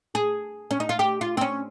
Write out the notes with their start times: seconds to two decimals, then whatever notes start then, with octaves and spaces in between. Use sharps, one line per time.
0.15 G#4
0.71 C#4
0.80 D#4
0.89 F4
0.99 G4
1.21 F4
1.37 C4
1.41 C#4